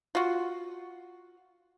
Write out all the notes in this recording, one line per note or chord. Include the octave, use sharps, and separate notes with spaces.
F4 F#4